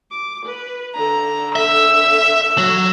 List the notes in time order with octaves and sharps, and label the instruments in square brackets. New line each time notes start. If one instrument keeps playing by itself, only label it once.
[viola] D6
B4
[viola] D3 A4 [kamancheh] A#5
[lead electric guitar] E5 [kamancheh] E6
[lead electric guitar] F#3